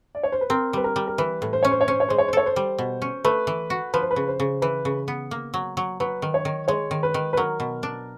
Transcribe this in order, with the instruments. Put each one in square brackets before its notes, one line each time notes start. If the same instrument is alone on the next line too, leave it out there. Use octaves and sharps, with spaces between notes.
[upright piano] D5
C#5
C5
B4
[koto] C4 [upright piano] A#4
[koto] G3 [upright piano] B4
[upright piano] A#4
[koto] G3
[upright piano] A#4
[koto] E3 [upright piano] B4
[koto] A2
[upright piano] C5
[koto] C#4 [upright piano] C#5
[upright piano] C5
C#5
[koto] C#4 [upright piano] C5
[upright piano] C#5
[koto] G#3 [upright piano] C5
[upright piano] C#5
C5
[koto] A4 [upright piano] C#5
[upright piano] C5
[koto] G3
B2
C#4
[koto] A3 [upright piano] B4
[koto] E3
F#4
[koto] F3 [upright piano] B4
[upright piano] C5
B4
[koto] C#3
[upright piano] C5
[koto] C#3
[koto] E3 [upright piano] B4
[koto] C#3
B3
A#3
F#3
F#3
[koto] F#3 [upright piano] B4
[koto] D#3
[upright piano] C#5
[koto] D#3
[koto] G#3 [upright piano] C#5
[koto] D#3
[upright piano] B4
[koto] D#3
[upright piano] B4
[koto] F#3 [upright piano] A#4
[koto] B2
D4